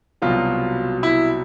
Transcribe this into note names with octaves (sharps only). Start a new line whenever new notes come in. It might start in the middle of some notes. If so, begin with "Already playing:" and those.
C2 B2 F#3 F4
E4